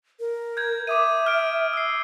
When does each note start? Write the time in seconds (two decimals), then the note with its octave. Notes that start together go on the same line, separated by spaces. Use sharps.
0.20 A#4
0.57 G6 G#6
0.87 E5 D6 D#6 D#7
1.26 F6 D7
1.73 E6 C7